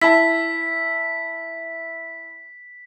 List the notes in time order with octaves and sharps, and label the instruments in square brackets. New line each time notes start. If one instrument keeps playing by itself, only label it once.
[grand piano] E4 A5 [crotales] B6